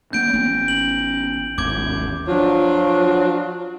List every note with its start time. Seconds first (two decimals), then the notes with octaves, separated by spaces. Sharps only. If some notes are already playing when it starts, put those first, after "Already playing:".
0.13 A#3 C#4 G6 D7
0.33 A1 B3 C#4
0.68 F#7
1.58 G#1 D#2 G#2 C#4 D6 G#6
2.28 F3 F#3 D4 F4